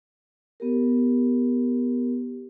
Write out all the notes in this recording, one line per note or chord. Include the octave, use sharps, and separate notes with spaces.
B3 G4 A#4